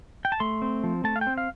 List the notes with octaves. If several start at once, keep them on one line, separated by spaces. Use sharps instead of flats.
G5
A5
A3 C6
C4
F3
A3 A5
F5
G5
C4
F5